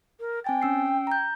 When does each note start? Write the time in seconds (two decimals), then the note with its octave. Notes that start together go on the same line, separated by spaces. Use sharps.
0.20 A#4
0.44 C4 G5 G#5 A6
0.62 C#4 E6 C7
1.07 A#5 G6